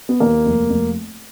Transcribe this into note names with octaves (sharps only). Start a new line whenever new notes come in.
B3
D#2 A#3
F1
F1